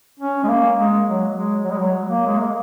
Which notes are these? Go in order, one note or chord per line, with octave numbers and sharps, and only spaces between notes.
C#4
G#3
A#3
G#3
F#3
G#3
F#3
G#3
F#3
A#3
G#3
A#3